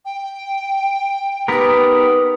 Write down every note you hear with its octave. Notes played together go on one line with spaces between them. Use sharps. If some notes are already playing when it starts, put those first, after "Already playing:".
G5
B3 D#4 G4 A#4 B4 D#6